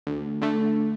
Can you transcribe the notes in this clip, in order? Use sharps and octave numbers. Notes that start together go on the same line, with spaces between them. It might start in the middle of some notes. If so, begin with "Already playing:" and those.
D2
D3 A3